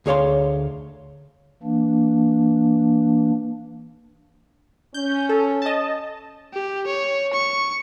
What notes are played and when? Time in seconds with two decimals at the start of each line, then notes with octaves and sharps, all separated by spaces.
0.06 D2 G#4 C#5 F5 C6
1.63 E3 A#3 D4
4.94 C#4 G6
5.29 A4
5.62 D#5 A5
6.53 G4
6.87 C#5
7.33 C#6